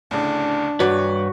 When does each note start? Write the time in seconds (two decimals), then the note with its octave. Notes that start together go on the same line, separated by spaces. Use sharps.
0.11 D2 A2 C#3 D4
0.80 G2 F#4 B4 C#5 D5